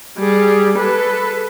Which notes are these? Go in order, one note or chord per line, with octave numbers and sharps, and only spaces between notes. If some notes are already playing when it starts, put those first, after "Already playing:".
G3 G#4
A4 B4